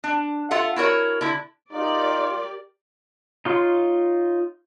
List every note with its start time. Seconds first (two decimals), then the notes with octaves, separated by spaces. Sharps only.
0.04 D4
0.51 F4 A4 E5 F#5
0.76 E4 F#4 A#4 C#5
1.21 D3 E4
1.72 D#4 F4 G4 A#4 D5
3.45 D#4 F4 C#5 C6